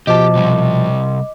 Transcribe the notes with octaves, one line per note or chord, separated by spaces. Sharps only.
B2 F3 G4 D#5 A5 D6
C3 G3